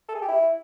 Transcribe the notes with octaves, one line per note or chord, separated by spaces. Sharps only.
A4
G#4
G4
E4